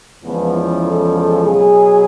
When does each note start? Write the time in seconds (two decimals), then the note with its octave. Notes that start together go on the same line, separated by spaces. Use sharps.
0.22 E2 C#3 F3 G#3 B3
0.54 E4
0.83 A4
1.13 A4
1.43 B2 F#3 G#4